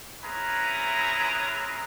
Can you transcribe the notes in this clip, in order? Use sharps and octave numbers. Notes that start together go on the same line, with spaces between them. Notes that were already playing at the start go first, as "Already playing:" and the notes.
C4 C#4 E4 G#4 B4 A#5